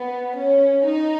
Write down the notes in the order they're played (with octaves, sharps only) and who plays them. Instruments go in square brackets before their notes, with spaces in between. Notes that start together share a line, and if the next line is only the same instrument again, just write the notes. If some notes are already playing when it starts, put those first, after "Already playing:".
Already playing: [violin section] B3
C#4
D#4